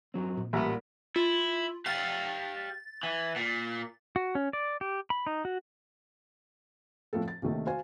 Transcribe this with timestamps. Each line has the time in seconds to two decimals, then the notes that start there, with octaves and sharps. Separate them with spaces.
0.14 F#2 F#3 C4
0.37 A#2
0.53 A1 G3 A#3 E5 F#5 B5
1.16 E4 F4
1.86 G4 F5 A6
3.03 E3
3.36 A#2
4.16 F#4
4.35 C#4
4.53 D5
4.81 G4
5.10 B5
5.27 D#4
5.45 F#4
7.13 A2 F3 C4 A4
7.28 A6
7.42 A#1 C3 D#3 A3
7.67 F#4 C5 F5 G#5